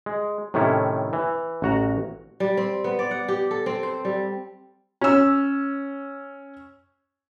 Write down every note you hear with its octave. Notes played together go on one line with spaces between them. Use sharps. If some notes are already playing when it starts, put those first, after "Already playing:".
G#3
A2 C3 D#3 A3 C#4 E4
E3
A1 F#4 A#5
G3
C4
B3
D5
F#5
G4
A4
C4
C5
G3
C#4 E6